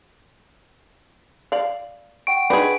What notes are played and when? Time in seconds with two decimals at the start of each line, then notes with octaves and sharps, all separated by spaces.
1.52 D5 F5
2.27 F#5 G5 C#6 D7
2.50 D4 D#4 G#4 B4